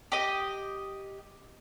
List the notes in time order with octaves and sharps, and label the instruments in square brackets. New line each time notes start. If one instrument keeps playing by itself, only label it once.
[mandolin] G4 D#5